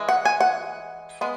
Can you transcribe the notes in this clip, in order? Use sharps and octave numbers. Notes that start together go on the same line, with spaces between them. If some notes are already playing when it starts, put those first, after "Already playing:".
Already playing: E3 G#3
F#5
G#5
F#5
G#3 B3